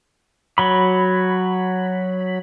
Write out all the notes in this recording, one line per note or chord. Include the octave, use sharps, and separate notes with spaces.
F#3 B5